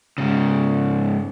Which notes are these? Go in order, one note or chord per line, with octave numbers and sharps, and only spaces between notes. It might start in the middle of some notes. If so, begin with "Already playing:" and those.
G#2 C#3